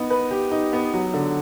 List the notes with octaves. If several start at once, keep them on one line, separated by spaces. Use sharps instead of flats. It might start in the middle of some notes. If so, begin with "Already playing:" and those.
Already playing: B3 D#4
B4
G4
D#4
B3
F#3
D3